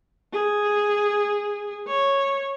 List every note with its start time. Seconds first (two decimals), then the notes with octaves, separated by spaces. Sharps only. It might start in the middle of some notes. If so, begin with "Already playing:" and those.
0.33 G#4
1.88 C#5